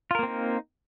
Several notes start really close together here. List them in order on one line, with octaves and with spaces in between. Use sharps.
F4 A#4 A#3 C4 D#4